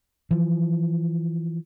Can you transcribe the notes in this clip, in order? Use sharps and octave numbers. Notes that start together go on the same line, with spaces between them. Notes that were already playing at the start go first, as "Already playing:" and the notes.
E3 F3